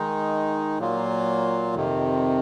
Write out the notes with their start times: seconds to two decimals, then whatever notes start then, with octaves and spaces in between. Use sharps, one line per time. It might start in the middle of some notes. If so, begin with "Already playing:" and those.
Already playing: D#3 G#3 D#4
0.79 A#2 F#3 A#3 F4
1.75 F2 C3 D#3